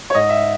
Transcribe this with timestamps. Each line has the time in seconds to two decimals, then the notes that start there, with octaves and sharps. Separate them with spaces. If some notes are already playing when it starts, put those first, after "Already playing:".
0.10 C#5
0.15 G#2 D#5
0.29 E5